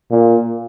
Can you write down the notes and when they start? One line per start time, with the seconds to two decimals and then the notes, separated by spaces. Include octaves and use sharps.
0.11 A#2